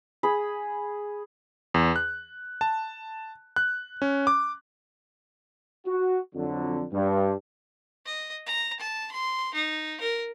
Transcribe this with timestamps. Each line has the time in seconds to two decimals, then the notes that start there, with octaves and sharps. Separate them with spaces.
0.23 G#4 B5
1.74 E2
1.96 F#6
2.61 A5
3.56 F#6
4.02 C#4
4.27 D6
5.87 F#4
6.35 F2 D3 F#3
6.93 G2
8.05 D#5
8.46 A#5
8.80 A5
9.12 C6
9.54 D#4
10.01 A#4